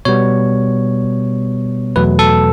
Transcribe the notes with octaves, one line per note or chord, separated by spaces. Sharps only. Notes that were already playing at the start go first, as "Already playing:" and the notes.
B2 G3 B3 C#5
E2 B2 F#3 A3 B4
A4